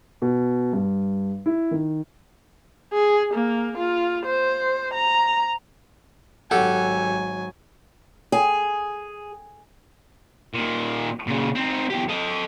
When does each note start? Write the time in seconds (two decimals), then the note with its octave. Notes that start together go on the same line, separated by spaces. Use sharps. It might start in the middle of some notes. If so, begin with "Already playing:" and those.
0.22 B2
0.73 G2
1.46 E4
1.71 D#3
2.94 G#4
3.34 A#3
3.78 F4
4.26 C5
4.94 A#5
6.51 G#1 F#3 G4 A4 F#5 G#5
8.32 G#4
10.54 A#2 D#3
11.27 A#2 C#3
11.55 C4 D#4
11.90 E2 G4
12.08 A4 D#5